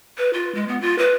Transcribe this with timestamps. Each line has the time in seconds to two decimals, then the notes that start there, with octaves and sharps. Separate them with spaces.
0.18 B4
0.33 F4
0.55 G#3
0.68 B3
0.81 F4
0.98 B4